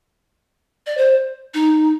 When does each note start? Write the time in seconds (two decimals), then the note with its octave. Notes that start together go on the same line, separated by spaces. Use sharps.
0.86 D5
0.97 C5
1.54 D#4